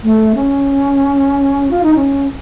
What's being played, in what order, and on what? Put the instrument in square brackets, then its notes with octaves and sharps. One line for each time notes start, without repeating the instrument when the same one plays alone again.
[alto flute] A3
C#4
F4
D#4
C#4